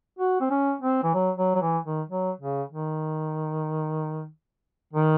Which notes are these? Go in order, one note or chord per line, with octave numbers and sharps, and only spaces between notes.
F#4
C4
C#4
C4
E3
F#3
F#3
F#3
E3
D#3
F#3
C#3
D#3
D#3